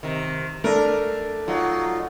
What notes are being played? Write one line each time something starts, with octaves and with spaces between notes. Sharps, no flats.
C3 D#3
A3 D4 A#4
F#3 D#4 F4